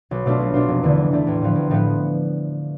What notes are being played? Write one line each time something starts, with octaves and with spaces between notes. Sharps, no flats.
B1
B2 A3 D4 F4
B1
B2 A3 D4 F4
F1
E2 D3 A3
F1
E2 D3 A3
A1
A2 F3 B3
A1
A2 F3 B3